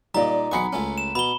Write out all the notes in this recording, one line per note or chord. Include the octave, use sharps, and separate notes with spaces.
A#2 G3 D#4 D5 D#5 A#5
B1 G#4 F#5 B5 C#6 C#7
C#2 A3 C#4
E7
B2 B5 G7